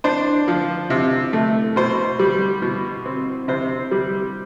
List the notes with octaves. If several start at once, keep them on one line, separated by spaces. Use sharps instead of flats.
D4 C5
F3
C3
A3
B2 C5
G3
B2
C4
C3 C5
G3